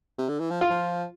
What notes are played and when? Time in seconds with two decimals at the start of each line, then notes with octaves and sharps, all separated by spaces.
0.18 C3
0.29 D3
0.39 E3
0.51 F3
0.61 F4
0.70 F3